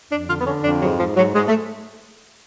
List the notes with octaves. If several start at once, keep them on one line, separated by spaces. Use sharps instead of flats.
F2 D4
D3 F4
B3
D3 C#4
F2 D4
G#2 F#3
G#2 F3
G#2 F#3
G#2 G#3
A3